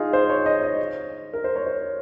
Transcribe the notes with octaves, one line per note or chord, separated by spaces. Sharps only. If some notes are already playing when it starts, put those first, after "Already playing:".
Already playing: D#4 F4 G#4
C5
C#5
D#5
D#5
A#4
C5
C#5
C5